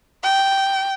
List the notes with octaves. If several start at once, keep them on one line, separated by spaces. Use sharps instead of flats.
G5